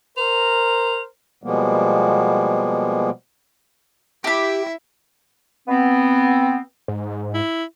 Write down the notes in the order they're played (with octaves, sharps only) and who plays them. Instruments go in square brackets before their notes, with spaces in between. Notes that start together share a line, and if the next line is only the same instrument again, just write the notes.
[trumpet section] A#4 [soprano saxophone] C5 [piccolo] F7
[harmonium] B2 F3 G3 G#3 A#3 B3
[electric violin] E4 E5 [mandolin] G4 B5
[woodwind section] B3 C4
[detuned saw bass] G#2
[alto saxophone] E4